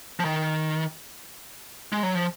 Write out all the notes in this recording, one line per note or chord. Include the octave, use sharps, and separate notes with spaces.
F3
D#3
G#3
F#3
F3